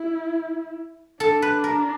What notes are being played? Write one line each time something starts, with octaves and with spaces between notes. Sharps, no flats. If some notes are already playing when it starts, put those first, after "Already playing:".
Already playing: E4
D4 A4
B4
A#4